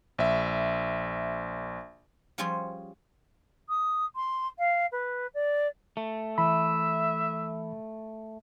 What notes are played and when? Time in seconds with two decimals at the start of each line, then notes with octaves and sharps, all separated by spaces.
0.18 A#1 E5
2.38 F3 G3 C#4 F4 G#4 C5
3.69 D#6
4.15 C6
4.58 F5
4.92 B4
5.34 D5
5.97 A3
6.38 E3 E5 B5